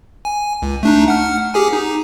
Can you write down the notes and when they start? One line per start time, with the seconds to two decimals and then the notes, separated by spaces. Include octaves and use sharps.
0.25 G#5
0.62 C#2
0.83 A3 D4 D#4
1.08 F#5 F6
1.54 G4 G#4 G#5
1.73 D#4